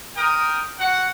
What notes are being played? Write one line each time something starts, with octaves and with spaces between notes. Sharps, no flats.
A#4 G5 D#6
F#4 F#5